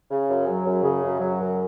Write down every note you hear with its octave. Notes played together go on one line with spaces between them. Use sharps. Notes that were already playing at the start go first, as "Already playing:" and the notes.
C#3
F#2
F#3
F#2
C#3
F#2
F#3
F#2